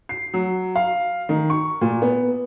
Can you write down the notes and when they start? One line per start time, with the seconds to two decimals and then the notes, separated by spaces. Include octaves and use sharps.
0.09 C7
0.34 F#3
0.76 F5
1.29 D#3
1.50 C#6
1.81 A#2
2.02 B3